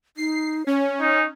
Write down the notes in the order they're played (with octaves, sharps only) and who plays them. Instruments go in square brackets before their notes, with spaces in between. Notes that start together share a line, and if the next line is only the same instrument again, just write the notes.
[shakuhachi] D#4 [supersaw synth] C7
[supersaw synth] C#4 [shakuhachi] C#5
[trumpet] D#4